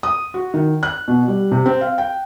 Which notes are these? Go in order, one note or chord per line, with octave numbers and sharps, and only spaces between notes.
D#6
F#4
D#3
F#6
B2
G3
C3
C4
F5
G5